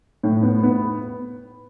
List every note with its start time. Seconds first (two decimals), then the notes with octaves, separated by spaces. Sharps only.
0.23 A2
0.43 B3
0.63 B3